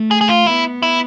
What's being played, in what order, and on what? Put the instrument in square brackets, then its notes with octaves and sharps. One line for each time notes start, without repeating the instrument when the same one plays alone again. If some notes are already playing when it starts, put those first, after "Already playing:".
Already playing: [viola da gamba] A3
[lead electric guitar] G#4
G#4
F4
[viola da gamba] B3 [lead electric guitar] E4
[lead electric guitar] E4